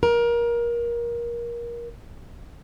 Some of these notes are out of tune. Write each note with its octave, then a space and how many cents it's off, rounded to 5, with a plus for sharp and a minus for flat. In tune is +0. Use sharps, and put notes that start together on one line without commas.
A#4 +20